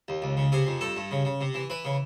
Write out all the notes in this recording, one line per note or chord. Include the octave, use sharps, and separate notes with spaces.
D#2
C#2
C#3
C3 G#4
F2
G2 A4
G2
C#3
C#3
C3
E3
E3 B4
C#3